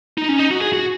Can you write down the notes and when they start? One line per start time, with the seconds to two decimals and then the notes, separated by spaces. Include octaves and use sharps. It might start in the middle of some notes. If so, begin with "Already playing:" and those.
0.18 D#4
0.29 C#4
0.39 D#4
0.51 F#4
0.62 G#4
0.73 F#4